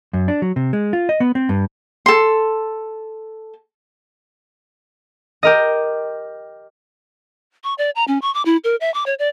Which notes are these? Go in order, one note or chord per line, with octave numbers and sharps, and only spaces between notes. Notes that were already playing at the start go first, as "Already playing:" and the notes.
F#2
D4
F#3
C3
G#3
F4
D#5
B3
C4
G2
A4 C6
G4 A#4 D#5
C#6
D5
A#5
C#4
C#6
D6
E4
A#4
E5
D6
C#5
D5